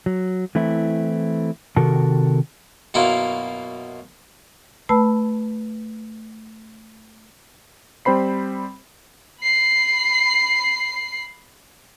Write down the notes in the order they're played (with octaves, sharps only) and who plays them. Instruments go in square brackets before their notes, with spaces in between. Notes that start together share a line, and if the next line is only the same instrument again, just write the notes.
[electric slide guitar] F#3
E3 A3 C4 E4
C3 D#3 F#4 A4 A#4 A5
[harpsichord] F#2 B2 A#3 E4 F4
[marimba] A3 B4 A5 B5 E6
[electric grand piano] G3 C4 C5 B5 C7
[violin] B5 C7